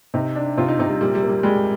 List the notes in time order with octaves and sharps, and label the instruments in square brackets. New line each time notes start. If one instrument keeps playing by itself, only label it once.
[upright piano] C3 [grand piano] D#4
[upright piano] D4
[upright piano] C3 [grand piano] F4
[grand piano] D#4
[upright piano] C3 [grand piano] D#4
[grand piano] G3
[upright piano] A#2 [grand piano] G3
[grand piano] G3
[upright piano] A#3
[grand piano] G3
[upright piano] G3 [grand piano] G#3